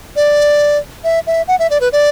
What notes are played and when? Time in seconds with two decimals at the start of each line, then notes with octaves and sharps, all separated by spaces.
0.16 D5
1.04 E5
1.27 E5
1.48 F#5
1.59 E5
1.70 D5
1.81 B4
1.93 D5